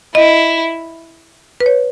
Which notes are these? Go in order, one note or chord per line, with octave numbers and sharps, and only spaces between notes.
E4 D#5
B4
C#5